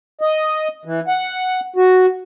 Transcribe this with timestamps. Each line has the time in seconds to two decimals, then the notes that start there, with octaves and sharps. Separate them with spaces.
0.21 D#5
0.85 E3
1.08 F#5
1.76 F#4